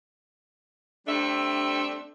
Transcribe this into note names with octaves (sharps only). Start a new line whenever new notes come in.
G3 A3 C4 D4 E5